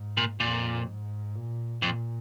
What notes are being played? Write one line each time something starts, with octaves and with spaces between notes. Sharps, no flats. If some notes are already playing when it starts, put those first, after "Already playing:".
Already playing: G#2
A#2
F2 A#2
G#2
A#2
F2 A#2